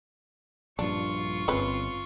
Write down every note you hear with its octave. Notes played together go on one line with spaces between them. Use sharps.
A#1 G2 D4 F4 C#6
D1 G1 C4 C#4 B4